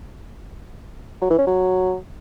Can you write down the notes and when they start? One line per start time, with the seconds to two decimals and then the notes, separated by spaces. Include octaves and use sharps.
1.22 F#3
1.30 E3
1.39 C#4
1.47 F#3